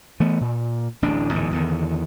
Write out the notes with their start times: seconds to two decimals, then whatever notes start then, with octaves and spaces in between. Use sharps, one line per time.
0.20 E3 A3 B3
0.41 A#2
1.02 D1 A1 A2 D4
1.32 D1 E2 G#2 D#3
1.52 E2 D3 D#3